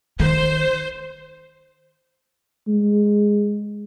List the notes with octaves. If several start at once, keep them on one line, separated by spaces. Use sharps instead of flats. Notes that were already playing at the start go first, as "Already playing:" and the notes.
D#3 C5
G#3